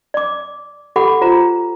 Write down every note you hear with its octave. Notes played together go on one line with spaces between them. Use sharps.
D5 D6
G4 A4 F#5 B5 D6
F4 C5 A#5